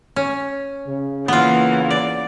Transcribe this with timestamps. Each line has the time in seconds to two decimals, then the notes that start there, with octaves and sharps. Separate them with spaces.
0.16 C#4
0.87 C#3
1.28 E3 A#3 B3 F4
1.90 D5